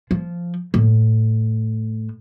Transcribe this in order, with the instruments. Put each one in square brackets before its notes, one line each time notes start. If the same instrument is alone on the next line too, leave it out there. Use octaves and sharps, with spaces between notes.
[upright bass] F3
A2